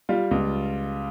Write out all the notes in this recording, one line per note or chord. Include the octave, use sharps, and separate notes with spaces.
G3 F4
C#2